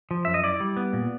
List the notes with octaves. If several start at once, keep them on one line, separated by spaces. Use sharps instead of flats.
F3
F#2 E5
D#5
E4 D5
G3
B3
A#2